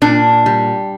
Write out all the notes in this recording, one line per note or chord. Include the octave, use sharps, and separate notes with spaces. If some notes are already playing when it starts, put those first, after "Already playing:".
A#2 D4
G3